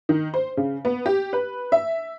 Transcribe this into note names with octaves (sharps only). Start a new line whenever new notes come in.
D#3
C5
C#3
B3
G4
B4
E5